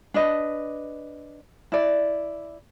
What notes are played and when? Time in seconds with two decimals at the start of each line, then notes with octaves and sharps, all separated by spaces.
0.14 D4 B4 D#5
1.72 E4 D5